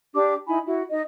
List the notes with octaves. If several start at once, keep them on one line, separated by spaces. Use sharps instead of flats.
D4 G4 D6
D#4 E4 G#5 B5
E4 F#4
D#4 D#5